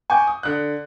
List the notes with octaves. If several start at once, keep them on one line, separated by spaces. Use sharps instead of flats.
G#5 C#6 D6 G6
D#6
D3 F#6